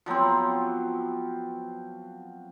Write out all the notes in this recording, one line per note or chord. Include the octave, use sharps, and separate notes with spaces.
F3 F#3 B3 C4